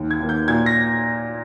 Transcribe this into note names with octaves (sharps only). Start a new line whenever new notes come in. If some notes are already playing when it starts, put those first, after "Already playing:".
Already playing: D#2
G#6
D#3 A#3
G6
A#2 G#6
A#6